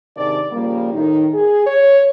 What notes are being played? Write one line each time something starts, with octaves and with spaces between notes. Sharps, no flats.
G#2 C3 D#3 D4 D5
C#3 F3 G3 A#3
A2 D#3 D#4
G#4
C#5